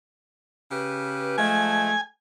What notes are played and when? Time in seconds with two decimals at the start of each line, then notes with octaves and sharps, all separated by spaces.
0.71 C#3 G4 B4
1.38 F3 G#3 A3 G#5